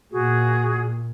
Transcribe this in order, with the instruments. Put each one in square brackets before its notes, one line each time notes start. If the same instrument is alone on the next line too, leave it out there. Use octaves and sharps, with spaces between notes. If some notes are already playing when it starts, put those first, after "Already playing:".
[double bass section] A#2 [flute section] F#4 G#4